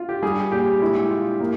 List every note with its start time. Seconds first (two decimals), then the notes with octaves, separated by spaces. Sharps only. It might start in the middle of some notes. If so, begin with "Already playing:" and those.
Already playing: F4
0.09 G4
0.22 G3 G#4
0.52 A#2 G4
0.82 G#3 E4
1.11 F4
1.40 A#3